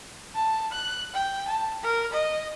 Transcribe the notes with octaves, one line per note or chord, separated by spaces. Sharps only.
A5
F#6
G5
A5
A#4
D#5